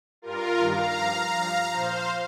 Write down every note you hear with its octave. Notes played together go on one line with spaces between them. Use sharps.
G2 G3 F4 A#4
G2 D#3 G3 F5 A#5
G2 F3
G2 F3
A#2 F3 C5 F5